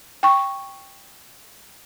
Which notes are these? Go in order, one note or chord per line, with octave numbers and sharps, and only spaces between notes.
G5 C#6